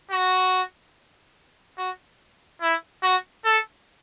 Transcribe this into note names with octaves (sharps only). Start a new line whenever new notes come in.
F#4
F#4
E4
F#4
A4